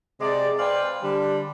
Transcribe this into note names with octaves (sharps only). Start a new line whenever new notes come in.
C3 G#3 D5
B4 C5 D5 F5 G5 G#5
D3 G3 D4